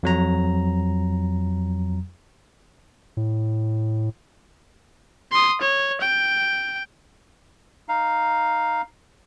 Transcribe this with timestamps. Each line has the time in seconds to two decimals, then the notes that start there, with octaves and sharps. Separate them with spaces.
0.03 F2 F#3 A#5
3.17 A2
5.32 C6 D#6
5.61 C#5
6.01 G5
7.89 D#4 F5